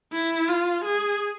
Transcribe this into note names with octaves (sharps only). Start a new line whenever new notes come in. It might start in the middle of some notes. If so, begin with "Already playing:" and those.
E4
F4
G#4